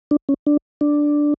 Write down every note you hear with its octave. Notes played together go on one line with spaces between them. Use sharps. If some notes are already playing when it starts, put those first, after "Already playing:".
D4
C#4
D4
D4